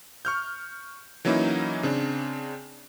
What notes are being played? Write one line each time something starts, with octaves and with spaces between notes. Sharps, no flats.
C#6 F6 G6
E3 F#3 A#3 C#4 D#4 E4
C#3 C4 D4